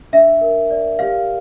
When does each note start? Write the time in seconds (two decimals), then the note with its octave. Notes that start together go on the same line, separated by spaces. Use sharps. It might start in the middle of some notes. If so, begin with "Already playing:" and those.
0.13 D4 E5
0.41 A#4
0.71 D5
0.98 G4 F5